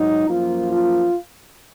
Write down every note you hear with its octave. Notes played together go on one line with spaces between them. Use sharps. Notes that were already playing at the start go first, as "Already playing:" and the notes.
Already playing: G#2 F#3 D#4
F#2 F3 A#3 F4
F4